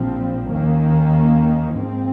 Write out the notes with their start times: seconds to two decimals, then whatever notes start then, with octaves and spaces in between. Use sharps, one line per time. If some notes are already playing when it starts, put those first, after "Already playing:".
Already playing: A#1 A#2 F3 C4
0.51 D#2 D#3 A#3 C#4
1.76 G#2 F3 C4